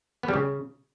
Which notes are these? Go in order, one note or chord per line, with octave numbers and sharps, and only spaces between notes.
B3
G3
C#3